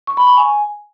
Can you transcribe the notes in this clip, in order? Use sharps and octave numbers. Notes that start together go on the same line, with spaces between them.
C#6
B5
C#6
G#5